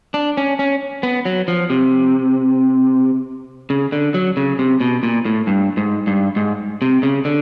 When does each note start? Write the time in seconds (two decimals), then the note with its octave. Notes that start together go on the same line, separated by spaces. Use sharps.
0.14 D4
0.37 C#4
0.59 C#4
1.03 B3
1.25 F#3
1.48 F3
1.70 C3
3.70 C#3
3.92 D3
4.14 F#3
4.37 C#3
4.59 C3
4.80 B2
5.03 A#2
5.25 A2
5.47 G2
5.77 G#2
6.07 G2
6.36 G#2
6.82 C3
7.03 C#3
7.25 D3